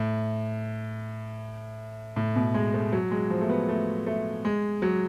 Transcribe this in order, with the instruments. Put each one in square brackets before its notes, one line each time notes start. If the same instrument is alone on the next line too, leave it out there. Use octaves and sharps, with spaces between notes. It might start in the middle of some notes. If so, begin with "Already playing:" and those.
Already playing: [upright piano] A2
A2
B2
G#3
A3
F#3
G#3
F3
A3
B3
A3
A3
G#3
F#3